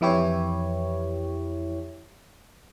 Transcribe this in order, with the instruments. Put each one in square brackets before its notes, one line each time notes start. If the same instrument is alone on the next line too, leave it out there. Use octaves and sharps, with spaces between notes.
[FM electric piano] F2 E3 E4 G4 C#5